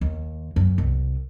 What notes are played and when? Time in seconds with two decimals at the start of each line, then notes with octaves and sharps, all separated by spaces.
0.01 D#2
0.56 F#2
0.78 C2